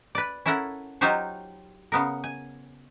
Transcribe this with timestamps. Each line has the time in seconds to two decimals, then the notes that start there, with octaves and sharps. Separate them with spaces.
0.15 B4 D5
0.46 C#4 E4 A4 A#4 F#5
1.01 F#3 D#4 F4 G4 C5 C#5
1.92 C#3 B3 A#4
2.24 G#5